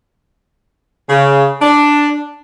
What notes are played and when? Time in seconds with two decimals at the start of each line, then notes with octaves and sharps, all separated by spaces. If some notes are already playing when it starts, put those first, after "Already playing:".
1.09 C#3
1.62 D4